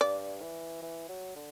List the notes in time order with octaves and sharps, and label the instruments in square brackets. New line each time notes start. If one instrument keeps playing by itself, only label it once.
[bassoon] G2 [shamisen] D5
[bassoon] E3
E3
F#3
D3